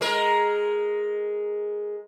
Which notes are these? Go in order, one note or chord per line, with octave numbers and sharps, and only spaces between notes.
G#3 A#4